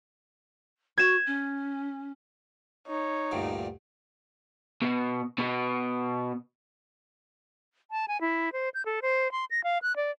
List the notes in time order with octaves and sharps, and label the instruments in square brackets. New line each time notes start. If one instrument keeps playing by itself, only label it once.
[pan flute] F#4 [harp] G#6 E7
[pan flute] C#4
[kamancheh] D#4 [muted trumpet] C#5
[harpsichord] D2 G2 A#2
[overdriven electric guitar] B2
B2
[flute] A5
G#5
E4
C5
G6
A4
C5
C6
A#6
F5
F#6
D5